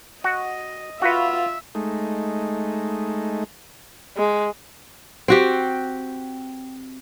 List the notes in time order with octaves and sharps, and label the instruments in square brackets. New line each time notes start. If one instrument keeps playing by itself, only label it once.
[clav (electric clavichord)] F#4 [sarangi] D#5
[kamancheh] F4 F5 [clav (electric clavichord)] F#4 B4 [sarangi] E5
[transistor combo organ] G#3 A3 D#4
[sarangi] G#3
[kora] C4 F#4 G4